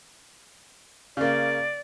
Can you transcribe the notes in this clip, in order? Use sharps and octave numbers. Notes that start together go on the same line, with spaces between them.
C#3 A#3 D5